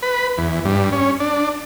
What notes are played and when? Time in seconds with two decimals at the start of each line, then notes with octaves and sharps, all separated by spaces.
0.02 B4
0.38 E2
0.65 G2
0.92 C#4
1.20 D4